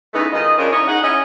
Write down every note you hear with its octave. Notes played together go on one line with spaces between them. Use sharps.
C#3 E3 A3 B3 D#4
D#3 G#3 F4 D#5
C#3 F3 C#4 D4 F4 A#4
C#4 D#4 E4 C#5 D#5
D#4 G#4 F#5
C#4 E4 D#5